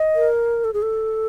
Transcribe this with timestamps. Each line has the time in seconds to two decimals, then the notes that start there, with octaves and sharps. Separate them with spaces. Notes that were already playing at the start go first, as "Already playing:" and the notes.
Already playing: D#5
0.15 A#4
0.64 A4
0.74 G#4
0.82 A4